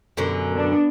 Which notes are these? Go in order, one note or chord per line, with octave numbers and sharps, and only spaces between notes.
F#2 B2 D3
B3 D4